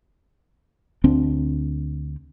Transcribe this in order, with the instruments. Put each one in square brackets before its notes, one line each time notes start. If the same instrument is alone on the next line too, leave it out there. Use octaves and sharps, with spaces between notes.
[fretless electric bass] D2 C4 D4